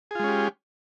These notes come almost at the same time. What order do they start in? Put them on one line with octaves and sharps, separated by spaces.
G#4 F4 G#3 C#4 G4